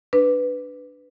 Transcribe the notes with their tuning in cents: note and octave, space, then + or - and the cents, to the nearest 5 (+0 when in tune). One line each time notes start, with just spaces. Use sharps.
D4 +0 B4 +10